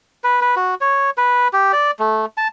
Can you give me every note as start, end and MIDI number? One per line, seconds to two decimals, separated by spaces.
0.24 0.41 71
0.41 0.55 71
0.56 0.75 66
0.81 1.10 73
1.17 1.48 71
1.53 1.72 67
1.73 1.91 74
1.99 2.26 57
2.37 2.48 81